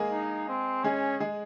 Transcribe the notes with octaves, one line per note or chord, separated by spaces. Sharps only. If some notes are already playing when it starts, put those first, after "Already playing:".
Already playing: G#3 A#3 G#4 A#4
D#4
C4
G#3 C#4 G#4
G#3 G#4